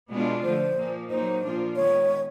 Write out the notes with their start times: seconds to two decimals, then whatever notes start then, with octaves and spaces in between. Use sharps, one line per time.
0.10 B2 G#3 B3 D4 F4
0.43 D3 F3 A3 C5
0.77 A#2 F3 A#3
1.10 F#3 A#3 D#4 C5
1.43 A#2 F3 A#3 D4 F4
1.76 D#3 G#3 B3 C#5